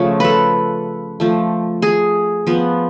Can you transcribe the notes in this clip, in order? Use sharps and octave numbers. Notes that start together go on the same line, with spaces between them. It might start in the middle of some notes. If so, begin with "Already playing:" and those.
Already playing: C#3 F3 A3 C#5
A4 B4
F3 A3
G#4
F3 B3